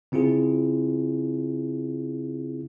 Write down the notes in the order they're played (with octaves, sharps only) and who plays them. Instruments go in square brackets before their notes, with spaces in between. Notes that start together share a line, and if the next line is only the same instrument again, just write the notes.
[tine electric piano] C#3 C4 E4 F4 G#4